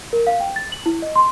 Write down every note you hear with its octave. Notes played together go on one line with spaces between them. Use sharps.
A#4
F5
G5
A6
F#7
E4
D#5
C6